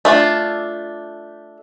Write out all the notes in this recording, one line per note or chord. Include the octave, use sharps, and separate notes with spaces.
A3 D4 F4